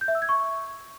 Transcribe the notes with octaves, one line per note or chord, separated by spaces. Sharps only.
G6
E5
E6
G#6
C#6